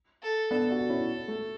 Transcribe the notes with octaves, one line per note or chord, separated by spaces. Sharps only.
A4
B3 D4 A4
D4 F#4
C#4 E4
A3